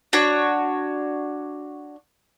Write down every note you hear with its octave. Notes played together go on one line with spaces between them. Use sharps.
D4 F#4 C#5